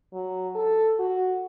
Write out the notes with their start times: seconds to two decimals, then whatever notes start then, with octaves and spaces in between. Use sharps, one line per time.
0.13 F#3
0.55 A4
0.99 F#4